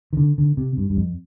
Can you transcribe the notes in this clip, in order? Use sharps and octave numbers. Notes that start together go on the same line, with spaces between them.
D#3
D3
D3
C3
G2
G2
F2